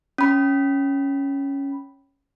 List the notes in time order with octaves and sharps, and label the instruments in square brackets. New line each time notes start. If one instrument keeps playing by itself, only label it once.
[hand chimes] C#4 B5